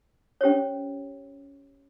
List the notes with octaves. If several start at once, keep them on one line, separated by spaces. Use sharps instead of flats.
C#4 G4 C5 C#5